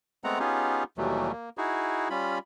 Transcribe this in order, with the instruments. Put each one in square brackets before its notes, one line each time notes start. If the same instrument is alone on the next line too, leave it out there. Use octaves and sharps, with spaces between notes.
[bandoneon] G#3 A3 B3 C4 F#5 A#5
B3 C#4 D#4 F4 G4 G#4
D#2 B2 E3 F#3 G3 A3
A#3
D#4 E4 F#4 G#4
G3 C#4 F4 B5